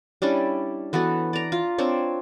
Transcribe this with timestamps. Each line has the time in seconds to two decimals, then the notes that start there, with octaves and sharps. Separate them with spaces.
0.22 G3 C#4 D4 E4
0.93 E3 B3 F#4 A4
1.33 D5 A#5
1.52 F4
1.78 C4 D4 C#5